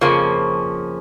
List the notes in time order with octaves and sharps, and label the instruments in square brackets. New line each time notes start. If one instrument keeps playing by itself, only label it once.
[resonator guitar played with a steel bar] F2 C#3 F3 A#3 C#4